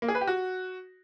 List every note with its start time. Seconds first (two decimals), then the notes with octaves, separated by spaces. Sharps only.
0.02 A#3
0.08 G#4
0.15 B4
0.21 G4
0.27 F#4